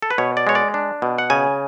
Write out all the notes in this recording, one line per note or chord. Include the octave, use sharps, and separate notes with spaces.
A4
B4
B2 C#5
D5
G#3 C#5
D5
D4
B2
F#5
C#3 G#5